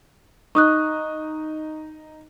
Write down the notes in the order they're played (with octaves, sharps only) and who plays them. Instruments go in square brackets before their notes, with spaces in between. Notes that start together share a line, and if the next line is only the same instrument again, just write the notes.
[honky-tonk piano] D#4 [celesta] C#6 D#6 F#6